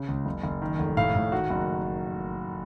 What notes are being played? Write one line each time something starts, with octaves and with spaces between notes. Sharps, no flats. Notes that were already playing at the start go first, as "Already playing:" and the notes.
Already playing: C#3
C#2
F#1
F#1
D#3
F1
A2 F5
A2
D#3 F#4
F#1